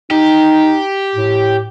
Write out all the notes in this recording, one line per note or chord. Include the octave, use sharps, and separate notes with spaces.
D#4 G4
A2